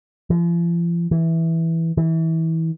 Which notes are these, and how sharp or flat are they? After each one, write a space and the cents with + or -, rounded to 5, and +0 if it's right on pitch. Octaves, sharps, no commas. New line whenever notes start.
F3 -40
E3 -5
E3 -25